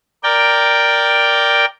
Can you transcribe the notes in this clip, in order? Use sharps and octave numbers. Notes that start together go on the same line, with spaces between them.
A#4 D5 G5